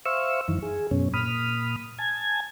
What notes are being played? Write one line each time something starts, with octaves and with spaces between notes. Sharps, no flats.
C5 E5 F5 C#6 E6
F#2 D#3 E3
G#4
F#2 B2 C#4
A#2 B5 D#6 F6
G#5 A5 G#6